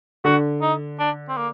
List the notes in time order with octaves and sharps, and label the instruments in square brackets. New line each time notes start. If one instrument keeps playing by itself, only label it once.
[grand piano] D3 [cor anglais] F#4
[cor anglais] D#4
D4
C4
A#3